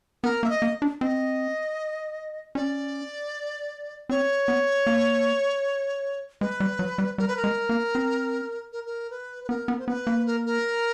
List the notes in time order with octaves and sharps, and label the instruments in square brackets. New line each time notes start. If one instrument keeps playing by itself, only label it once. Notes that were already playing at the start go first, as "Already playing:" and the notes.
[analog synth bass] B3 [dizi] A#4
[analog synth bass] A#3 [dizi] E5
[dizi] D#5
[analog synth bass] A#3
D4
[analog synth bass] C4 [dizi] D#5
[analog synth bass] C#4 [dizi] D5
[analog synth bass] C4 [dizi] C#5
[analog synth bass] B3
A#3
[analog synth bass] G#3 [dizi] B4
[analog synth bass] G3
F#3
G3
[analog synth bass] G3 [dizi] A#4
[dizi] B4
A#4
[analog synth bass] G#3
A#3
C4
[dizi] A#4
A#4
B4
B4
[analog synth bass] B3 [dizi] A#4
[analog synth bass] B3
[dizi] C5
[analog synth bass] B3 [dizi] B4
[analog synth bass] A#3
[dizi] A#4
A#4